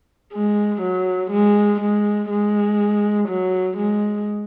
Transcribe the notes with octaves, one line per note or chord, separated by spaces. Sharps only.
G#3
F#3
G#3
G#3
G#3
F#3
G#3